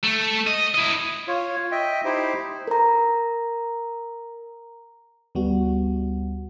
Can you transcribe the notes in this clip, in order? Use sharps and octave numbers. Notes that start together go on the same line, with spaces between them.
A3
D#5
E4 D#5
F4 C#5
D#5 E5 G5
D#4 E4 G4 C5
A#4 A#5
D2 G3 B3 F#4